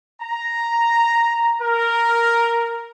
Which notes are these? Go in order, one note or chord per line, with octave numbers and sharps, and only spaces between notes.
A#5
A#4